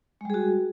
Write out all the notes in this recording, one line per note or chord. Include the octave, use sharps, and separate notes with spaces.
G3 G#3 F#4 G#4